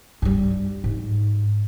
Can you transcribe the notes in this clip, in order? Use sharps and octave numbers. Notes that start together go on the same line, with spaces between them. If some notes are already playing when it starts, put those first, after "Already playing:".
G2 G3
G#2